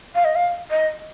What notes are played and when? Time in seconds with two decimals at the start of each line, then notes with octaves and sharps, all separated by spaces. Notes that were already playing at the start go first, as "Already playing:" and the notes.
0.15 F5
0.25 D#5
0.35 F5
0.71 D#5